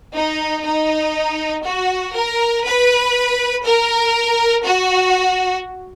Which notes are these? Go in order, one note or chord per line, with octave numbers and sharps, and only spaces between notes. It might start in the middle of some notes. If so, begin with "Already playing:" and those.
D#4
D#4
F#4
A#4
B4
A#4
F#4